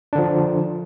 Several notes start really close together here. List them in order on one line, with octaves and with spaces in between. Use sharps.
D4 D3 F3